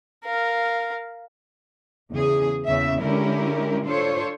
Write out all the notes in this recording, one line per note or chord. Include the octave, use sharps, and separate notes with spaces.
A#4 F5
E2 C#3 G#4
E2 C#3 E5
D3 G#3 C#4 E4 G4 A#4
D4 F4 A4 C5 C#5